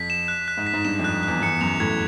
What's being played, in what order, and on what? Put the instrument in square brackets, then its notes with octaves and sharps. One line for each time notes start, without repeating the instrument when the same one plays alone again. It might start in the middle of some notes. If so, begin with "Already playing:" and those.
Already playing: [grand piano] F2 [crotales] B6
[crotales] E7
F#6
F#6
[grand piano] G#2
[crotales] B6
[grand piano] G#2
[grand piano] G2 [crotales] E7
[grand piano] F2
[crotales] F#6
[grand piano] E2 [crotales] F#6
[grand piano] E2 [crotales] C#7
[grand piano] F#2 [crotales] F7
[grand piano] A2 [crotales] G#6